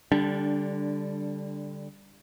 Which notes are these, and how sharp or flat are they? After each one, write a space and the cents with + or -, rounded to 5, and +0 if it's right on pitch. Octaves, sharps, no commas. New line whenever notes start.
D3 +0 G3 +15 D4 -15